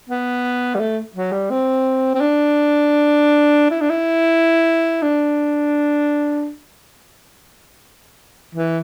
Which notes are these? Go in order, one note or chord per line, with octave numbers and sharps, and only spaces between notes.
B3
G3
A3
F#3
G3
C4
C4
D4
E4
D4
E4
D4
E3